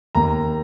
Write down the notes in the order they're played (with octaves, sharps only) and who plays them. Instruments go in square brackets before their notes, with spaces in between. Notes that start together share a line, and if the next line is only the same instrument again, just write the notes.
[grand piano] D#2 A#5